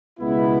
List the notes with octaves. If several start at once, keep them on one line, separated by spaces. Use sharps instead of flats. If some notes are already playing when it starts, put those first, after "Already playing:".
C#2 B2 G#3 B3 E4